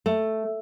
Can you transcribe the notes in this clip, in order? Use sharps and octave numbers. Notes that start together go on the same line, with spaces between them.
A3